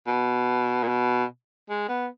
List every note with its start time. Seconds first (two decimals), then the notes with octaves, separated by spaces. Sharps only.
0.06 B2
0.83 A#2
0.88 B2
1.69 G#3
1.89 B3